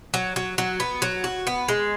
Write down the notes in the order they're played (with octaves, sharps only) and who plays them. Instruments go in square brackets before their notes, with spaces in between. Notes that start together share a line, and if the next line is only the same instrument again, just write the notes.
[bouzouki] F#3
F#3
F#3
B3
F#3
F#4
B3
G#3